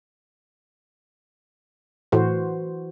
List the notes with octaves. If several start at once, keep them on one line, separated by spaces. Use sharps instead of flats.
A2 E3 F#4 C5